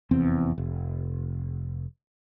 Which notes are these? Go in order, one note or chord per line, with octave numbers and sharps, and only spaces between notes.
F1 E2 C4
F1